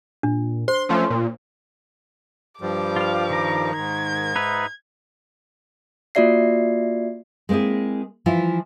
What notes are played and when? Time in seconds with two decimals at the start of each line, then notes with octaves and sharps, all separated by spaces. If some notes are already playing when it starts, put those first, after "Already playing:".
0.23 A#2 D4
0.68 C5 C6
0.89 F3 A3 C#4 C6
1.10 A#2
2.61 G2 F3 G3 D6
2.96 F4 F5
3.30 D#3 A#4
3.77 G#2 G#6
4.36 D#4 B4 E5
6.15 A#3 F4 F#4 D5 E5 C7
7.49 G#3 A#3 C4 E4 G#4
8.26 E3 F3 E4 F4